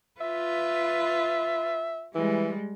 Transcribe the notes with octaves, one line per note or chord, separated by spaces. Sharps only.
F4 B4 E5
E3 G3 G#3